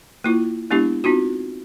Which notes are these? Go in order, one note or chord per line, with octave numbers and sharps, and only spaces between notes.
A#3 E4 F4
G#3 B3 D4 E4 G4
C4 D#4 F4 F#4